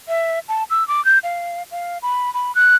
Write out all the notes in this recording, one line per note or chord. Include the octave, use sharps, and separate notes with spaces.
E5
A5
E6
D6
G6
F5
F5
B5
B5
F#6